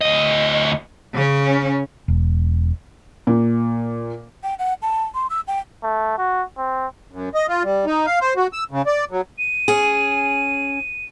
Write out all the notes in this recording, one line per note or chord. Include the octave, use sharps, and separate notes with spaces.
D2 D#5
C#3 C#4
E1
A#2
G5
F#5
A5
C6
E6
G5
A3
F#4
C4
F#2
D#5
F4
G3
D#4
F5
C5
F#4
E6
C#3
D5
F#3
D#7
C#4 G#4